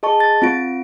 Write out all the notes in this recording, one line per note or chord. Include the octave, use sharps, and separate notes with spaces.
G#4 D#5 A5 C#6
A6
C4 F4 D7